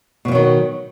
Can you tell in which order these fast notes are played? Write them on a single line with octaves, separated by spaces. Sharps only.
B2 F3 F#3 D#3